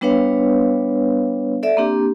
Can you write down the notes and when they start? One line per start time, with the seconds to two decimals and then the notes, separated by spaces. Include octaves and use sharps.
0.01 G3 B3 D4 B4 C#5 F5
1.63 A4 D5 E5
1.77 A#3 C4 D4 G4